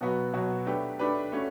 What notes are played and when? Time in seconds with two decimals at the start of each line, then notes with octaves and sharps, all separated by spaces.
0.01 B2 F#3 B3 F#4
0.33 B2 F#3 B3 F#4
0.66 A3 D4 G4 B4
0.99 A3 D4 G4 B4
1.32 A3 C#4 F#4